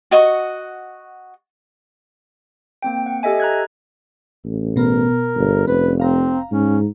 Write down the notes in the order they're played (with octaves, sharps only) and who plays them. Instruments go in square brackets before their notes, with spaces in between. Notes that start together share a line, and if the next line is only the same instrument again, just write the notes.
[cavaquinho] F#4 D#5 F#5 C#6
[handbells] A#3 C4 G5
F#5
G4 A4 D#5 E5 G#5
A#5 F#6 G#6
[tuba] A1
[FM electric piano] B2 B3 [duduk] A#4
[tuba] G1
[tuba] F1 [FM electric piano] C4 C#4 [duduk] B4
[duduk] C4 [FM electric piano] F5 A#5
[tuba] G#2 [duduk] C#4